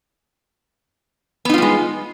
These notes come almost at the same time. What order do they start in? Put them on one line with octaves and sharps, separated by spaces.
B3 D#4 F4 G3 G#3